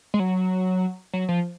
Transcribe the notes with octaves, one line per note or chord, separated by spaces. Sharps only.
G#3
F#3
F#3
F3